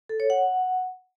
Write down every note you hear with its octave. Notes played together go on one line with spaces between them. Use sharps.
A4
C#5
F#5